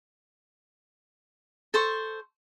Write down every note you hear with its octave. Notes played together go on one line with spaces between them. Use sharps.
A4 C5 C#6